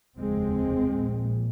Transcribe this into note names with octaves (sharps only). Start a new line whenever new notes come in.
F1 D#2 C#3 G#3 C4
A#1 A#2